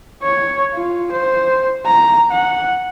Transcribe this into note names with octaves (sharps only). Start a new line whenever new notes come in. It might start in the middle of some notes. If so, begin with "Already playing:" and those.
C#5
F4
C5
A#5
F#5